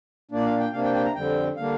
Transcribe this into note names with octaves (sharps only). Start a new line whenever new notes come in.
A#2 A#3 D4 D5
F5
G5
C3 A#3 D4 F5
G5
G5
A#5
F2 D3 G3 C4 G5
D3 G3 A#3 D4 F5